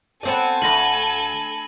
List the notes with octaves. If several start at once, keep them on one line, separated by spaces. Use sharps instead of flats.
B3 C4 A4 D5 G#5
D2 B5 A#6 F#7